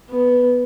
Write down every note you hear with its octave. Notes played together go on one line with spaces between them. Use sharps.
B3